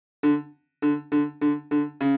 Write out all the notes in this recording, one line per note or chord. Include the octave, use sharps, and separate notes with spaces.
D3
D3
D3
D3
D3
C#3